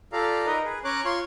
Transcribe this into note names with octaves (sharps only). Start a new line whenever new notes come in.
F4 G4 A4 D5 F5 A#5
D#4 A#4 B4 D#5
G#4 B4
C#4 C#5 A#5 D6 F#6
F4 C#5 C6